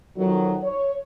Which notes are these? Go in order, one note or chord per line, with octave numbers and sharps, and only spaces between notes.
F2 D#3 F#3
C#5